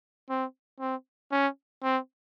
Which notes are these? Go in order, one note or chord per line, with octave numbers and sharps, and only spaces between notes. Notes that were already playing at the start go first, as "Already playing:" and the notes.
C4
C4
C#4
C4